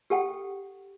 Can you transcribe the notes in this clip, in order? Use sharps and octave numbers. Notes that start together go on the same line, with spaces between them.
G4 A4 F#5 G5